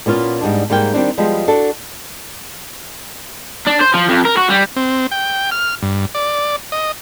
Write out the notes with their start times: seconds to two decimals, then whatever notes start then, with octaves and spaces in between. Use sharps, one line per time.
0.06 A#2 B3 C#4 F4
0.41 G#2 G3 B3 D4
0.70 G#2 G3 A#3 F5 G5
0.94 D#3 G3 C4 D4
1.18 F3 G3 G#3 B3
1.48 D4 F#4 A4
3.67 D4
3.81 C5
3.94 F3
4.09 F2
4.25 A#4
4.37 F#4
4.50 G3
4.76 C4
5.11 G5
5.51 F6
5.82 G2
6.15 D5
6.72 D#5